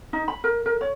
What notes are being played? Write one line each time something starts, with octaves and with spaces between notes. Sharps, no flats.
D#4
B5
A#4
A#4
C#5